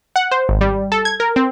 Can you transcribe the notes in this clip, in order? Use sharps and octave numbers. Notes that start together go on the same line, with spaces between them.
F#5
C5
G#1
G3
A4
G#6
A#4
C4